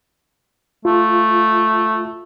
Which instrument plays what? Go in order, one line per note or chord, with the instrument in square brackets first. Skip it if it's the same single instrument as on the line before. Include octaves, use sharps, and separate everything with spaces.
[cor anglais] A3 [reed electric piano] F4